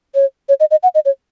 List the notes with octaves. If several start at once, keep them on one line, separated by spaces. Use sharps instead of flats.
C#5
C#5
D#5
D#5
F#5
D#5
C#5